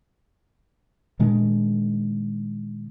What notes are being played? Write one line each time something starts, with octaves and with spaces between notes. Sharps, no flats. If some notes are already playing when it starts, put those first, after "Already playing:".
A#2 D#3 G#3 D4